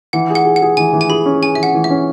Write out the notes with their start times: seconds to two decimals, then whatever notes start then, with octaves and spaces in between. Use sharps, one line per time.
0.13 E3 F#5
0.30 G#4
0.35 F#5
0.45 G#4
0.56 F#5
0.62 G#4
0.77 E3 G#5
0.93 E3
1.01 G#5
1.10 G#4 B5
1.26 C#4
1.42 G#4 G#5
1.55 E3 E5
1.63 F#5
1.75 E3
1.84 E5
1.90 C#4